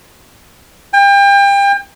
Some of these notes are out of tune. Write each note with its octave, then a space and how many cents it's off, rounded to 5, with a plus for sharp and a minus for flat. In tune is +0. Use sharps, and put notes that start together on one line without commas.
G5 +30